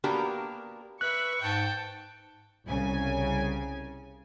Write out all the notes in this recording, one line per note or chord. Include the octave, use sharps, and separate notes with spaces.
A#3 B3 D4 F#4 G4 A#4
B4 E5 C#6 F#6
G#2 G5 A5
C2 C#3 G#5